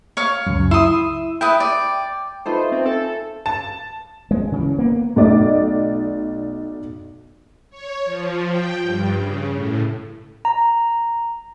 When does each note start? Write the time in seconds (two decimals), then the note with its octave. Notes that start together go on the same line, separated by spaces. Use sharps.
0.17 C#5 F5 C#6
0.47 C#2 F#2
0.71 E4 C6 D#6 E6
1.41 E4 B4 G5 D#6
1.60 D5
2.46 A3 D#4 F4 B4 C5
2.72 C4
2.86 A4 G#5
3.46 A5
4.31 G#3
4.52 C#3 E3
4.79 A#3 B3
5.16 B1 A3 D5 D#5
7.70 C#5
8.05 F3
8.47 G5
8.81 G2
9.17 C#3
9.53 A2
10.45 A#5